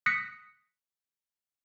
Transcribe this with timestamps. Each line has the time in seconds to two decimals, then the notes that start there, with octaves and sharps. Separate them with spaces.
0.06 D#6 F#6 A#6 B6 C#7